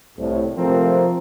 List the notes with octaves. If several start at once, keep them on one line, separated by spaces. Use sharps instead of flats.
C2 A2
C3 F3 A3 C4 A#4